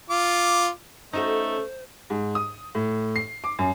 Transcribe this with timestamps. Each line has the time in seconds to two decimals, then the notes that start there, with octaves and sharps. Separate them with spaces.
0.10 F4 D6
1.13 A3 C#4 D#4 F#4 A4 C5
2.10 G#2
2.35 D#6
2.75 A2
3.16 C7
3.44 D6
3.59 F#2